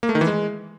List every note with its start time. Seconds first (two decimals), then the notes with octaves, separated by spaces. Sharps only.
0.03 A#3
0.09 A3
0.15 D#3
0.21 E3
0.27 G#3